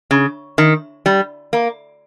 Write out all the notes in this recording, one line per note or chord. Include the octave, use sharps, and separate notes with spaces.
C#3
D#3
G3
A#3